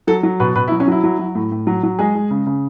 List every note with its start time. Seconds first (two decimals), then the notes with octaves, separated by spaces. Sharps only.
0.07 F#3 A4
0.23 F#3
0.40 B2 B4
0.55 B2 B4
0.68 E4
0.72 F#3
0.80 C#4
0.87 F#3 E4
1.03 F#3
1.19 F#3
1.35 A2
1.52 A2
1.67 F#3
1.83 F#3
1.99 G#3 G#4
2.15 G#3
2.31 C#3
2.46 C#3